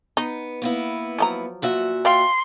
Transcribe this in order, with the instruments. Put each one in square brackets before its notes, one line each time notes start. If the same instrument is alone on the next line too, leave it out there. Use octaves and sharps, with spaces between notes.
[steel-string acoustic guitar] B3 [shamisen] D#4
[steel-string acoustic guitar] A#3 B3 E4
[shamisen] F3 F#3 A#5
[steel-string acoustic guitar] A#2 F#4 E5
[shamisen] D5 F5 G5 [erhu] C6